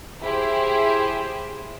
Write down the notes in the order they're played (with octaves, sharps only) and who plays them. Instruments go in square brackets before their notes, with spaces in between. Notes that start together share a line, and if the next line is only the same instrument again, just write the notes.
[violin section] E4 G4 G#4 C5